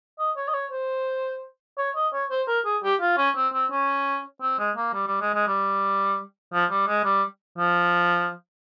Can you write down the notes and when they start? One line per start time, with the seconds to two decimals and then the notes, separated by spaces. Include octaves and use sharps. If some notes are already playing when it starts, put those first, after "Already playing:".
0.19 D#5
0.37 C#5
0.48 D#5
0.54 C#5
0.71 C5
1.78 C#5
1.96 D#5
2.13 C#5
2.30 C5
2.48 A#4
2.65 G#4
2.83 G4
3.01 F4
3.18 C#4
3.36 C4
3.53 C4
3.71 C#4
4.42 C4
4.59 G#3
4.77 A#3
4.93 G3
5.07 G3
5.21 G#3
5.34 G#3
5.47 G3
6.53 F3
6.71 G3
6.88 G#3
7.04 G3
7.58 F3